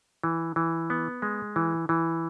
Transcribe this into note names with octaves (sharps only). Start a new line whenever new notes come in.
E3
E3
B3
G#3
E3
E3